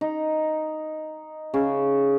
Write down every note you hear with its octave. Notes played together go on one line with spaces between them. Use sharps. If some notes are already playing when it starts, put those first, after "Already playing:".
D#4
C#3